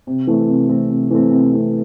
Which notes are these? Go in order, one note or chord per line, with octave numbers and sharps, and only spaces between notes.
C3
E3 A3 C4
C3
E3 A3 C4
C3
E3 A3 C4
C3
E3 A3 C4